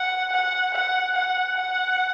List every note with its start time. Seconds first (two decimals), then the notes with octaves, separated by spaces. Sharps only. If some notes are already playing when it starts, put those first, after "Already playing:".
Already playing: F#5
0.32 F#5
0.74 F#5
1.15 F#5
1.57 F#5